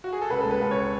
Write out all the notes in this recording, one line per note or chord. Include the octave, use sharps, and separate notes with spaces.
F#4
G#4
A4
C#2 B4
G#3 A4
B4
C#2
C#5